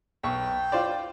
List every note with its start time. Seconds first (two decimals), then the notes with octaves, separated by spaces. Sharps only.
0.24 B1 G5 C#6
0.72 F4 C5 D5